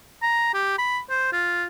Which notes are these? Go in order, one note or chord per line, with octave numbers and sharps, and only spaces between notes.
A#5
G4
B5
C5
F4